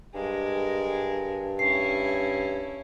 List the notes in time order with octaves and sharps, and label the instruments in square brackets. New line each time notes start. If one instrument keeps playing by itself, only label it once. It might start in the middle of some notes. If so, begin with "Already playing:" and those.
[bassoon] G2 [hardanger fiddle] G#3 A#4
[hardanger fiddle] C#4 E4 [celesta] C7